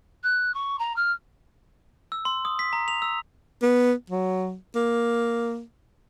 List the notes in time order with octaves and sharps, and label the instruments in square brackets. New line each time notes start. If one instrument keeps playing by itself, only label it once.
[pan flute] F#6
C#6
A#5
F6
[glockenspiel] E6
C6
D#6
B6
A#5
F7
E6
[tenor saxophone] B3
F#3
A#3